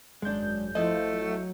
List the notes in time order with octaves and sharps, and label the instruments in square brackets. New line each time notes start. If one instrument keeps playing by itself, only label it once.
[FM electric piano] G#1 G6 [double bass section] F#2 [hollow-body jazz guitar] G#3 D4
[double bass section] F3 [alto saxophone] A3 [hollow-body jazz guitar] E4 D#5
[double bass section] F#3